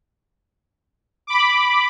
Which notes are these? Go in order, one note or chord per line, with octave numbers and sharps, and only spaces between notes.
B5 D6